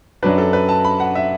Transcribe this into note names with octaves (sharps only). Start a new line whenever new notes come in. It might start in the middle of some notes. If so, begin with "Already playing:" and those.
F#2 F#3 D4 B4
A4
B4
A5
B5
F#5
E5